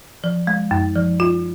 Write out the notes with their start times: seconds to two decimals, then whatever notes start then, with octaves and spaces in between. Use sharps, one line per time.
0.24 F3
0.47 G#3
0.71 F#2
0.95 F3
1.20 F4